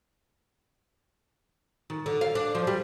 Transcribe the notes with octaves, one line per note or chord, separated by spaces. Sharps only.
D#3
D3
F5
D4
F3
G3